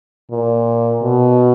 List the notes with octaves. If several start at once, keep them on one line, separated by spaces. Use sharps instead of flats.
A#2
B2